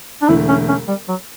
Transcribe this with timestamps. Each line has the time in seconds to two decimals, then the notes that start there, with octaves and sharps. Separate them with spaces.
0.22 D4
0.28 E1 E2 D3 A3 E4
0.49 C#4
0.69 C#4
0.88 G3
1.09 F#3